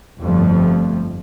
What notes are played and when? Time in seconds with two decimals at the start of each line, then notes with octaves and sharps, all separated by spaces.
0.21 G1 F2 F3 G3 A3